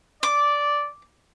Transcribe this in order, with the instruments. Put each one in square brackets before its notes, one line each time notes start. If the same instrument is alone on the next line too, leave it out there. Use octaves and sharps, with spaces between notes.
[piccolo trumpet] D5 [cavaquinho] D6